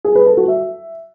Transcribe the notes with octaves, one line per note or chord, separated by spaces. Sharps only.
G#4
B4
A4
F#4
E5